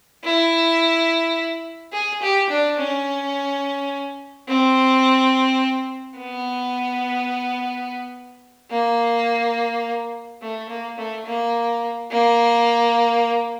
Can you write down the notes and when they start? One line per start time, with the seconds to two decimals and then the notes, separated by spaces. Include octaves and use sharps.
0.24 E4
1.93 G#4
2.22 G4
2.50 D4
2.78 C#4
4.48 C4
6.18 B3
8.71 A#3
10.42 A3
10.69 A#3
10.98 A3
11.27 A#3
12.11 A#3